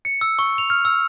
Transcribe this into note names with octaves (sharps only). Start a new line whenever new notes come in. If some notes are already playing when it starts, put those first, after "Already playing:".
C#7
E6
C#6
F7
F6
E6